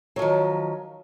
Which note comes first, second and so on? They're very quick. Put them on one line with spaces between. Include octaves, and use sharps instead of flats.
F#3 F3 D#3